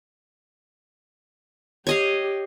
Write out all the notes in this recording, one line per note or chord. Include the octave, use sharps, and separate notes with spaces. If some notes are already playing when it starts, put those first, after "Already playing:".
G4 C#5 D#5 F5